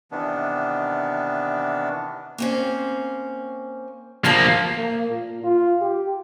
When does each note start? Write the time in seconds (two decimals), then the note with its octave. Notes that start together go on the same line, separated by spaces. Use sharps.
0.12 C3 D#3 E3 B3 D4
2.38 A#3 C4 C#4
4.24 D2 F3 A#3 F5 A5
4.77 A#3
5.10 A#2
5.43 F4
5.81 G4